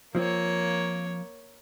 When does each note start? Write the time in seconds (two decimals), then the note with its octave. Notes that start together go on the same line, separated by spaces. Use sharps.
0.15 F3 A#3 C4 C#5